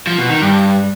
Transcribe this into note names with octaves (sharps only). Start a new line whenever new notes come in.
F3
B2
D#3
G2